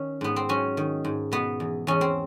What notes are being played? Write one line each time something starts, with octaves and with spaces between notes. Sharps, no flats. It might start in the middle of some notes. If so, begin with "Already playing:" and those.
Already playing: D#3 C#4
G#2 B3
C4
F#3 C#4
D#3
G#2
B2 B3
E2
E2 C#4
C4